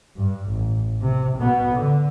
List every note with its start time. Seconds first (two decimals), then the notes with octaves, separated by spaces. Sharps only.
0.17 G2
0.50 A1
1.02 C3
1.37 B2 B3
1.75 D3